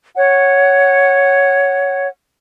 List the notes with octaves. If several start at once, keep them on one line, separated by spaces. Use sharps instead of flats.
C#5 F#5